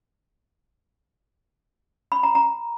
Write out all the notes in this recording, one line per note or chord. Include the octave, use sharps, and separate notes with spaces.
B5
A#5
A#5